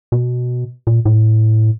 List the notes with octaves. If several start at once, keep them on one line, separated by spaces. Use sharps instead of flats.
B2
A#2
A2